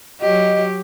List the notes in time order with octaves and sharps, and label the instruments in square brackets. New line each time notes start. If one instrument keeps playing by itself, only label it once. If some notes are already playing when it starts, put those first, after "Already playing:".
[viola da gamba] F#3 G4 [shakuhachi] D#5